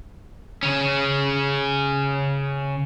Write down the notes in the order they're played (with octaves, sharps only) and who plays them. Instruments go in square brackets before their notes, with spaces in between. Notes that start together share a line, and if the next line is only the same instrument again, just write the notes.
[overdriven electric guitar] C#3 C#4